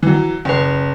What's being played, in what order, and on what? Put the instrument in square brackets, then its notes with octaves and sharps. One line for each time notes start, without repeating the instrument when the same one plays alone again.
[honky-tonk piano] E3 F#3
[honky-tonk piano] F#1 [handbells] C#4 B4